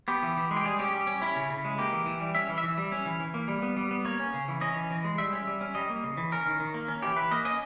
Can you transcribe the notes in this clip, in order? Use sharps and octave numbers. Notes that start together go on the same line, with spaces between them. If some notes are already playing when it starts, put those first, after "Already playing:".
B3 G4
E3
E3
G#3
G4
G3 G#4
C#4 G4
G3
C#4
C#4 E4
C#3
C#3
G#3
A#3 G4
E3
E3
G3
C#4 E5
E3
E5
E3
G3
C#4
E3
E3
A#3
G3
B3
G3
B3
A#3 C#5
C#4
C#3
E3
C#4 D#5
E3
E3
G#3
G3 E5
C#4
G3
C#4
G3 D#5
A#3
C#3
E3
C#4 A#4
D#3
D#3
A#3
C#4
E3 G4
E3 B4
A#3 D#5
C#4 D#5